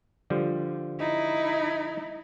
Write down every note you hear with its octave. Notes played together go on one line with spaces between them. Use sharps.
D3 F3 G3
D#4 E4